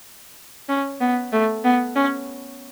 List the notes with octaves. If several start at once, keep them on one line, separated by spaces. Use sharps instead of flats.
C#4
B3
A3
B3
C#4